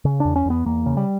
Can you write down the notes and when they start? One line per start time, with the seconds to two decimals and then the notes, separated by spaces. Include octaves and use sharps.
0.05 C#3
0.20 E2 D4
0.36 C#4
0.45 E2 B3
0.66 E2 A#3
0.86 C#3
0.97 G3